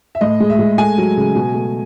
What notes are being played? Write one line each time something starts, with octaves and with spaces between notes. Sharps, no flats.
E5
A2 D#5
G#3
E5
G#3
A3 G#5
F#3
C#3
B2
A3